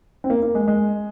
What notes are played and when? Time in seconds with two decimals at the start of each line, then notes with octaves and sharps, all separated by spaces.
0.24 C4
0.30 A#3
0.43 A#3
0.55 G#3
0.68 G#3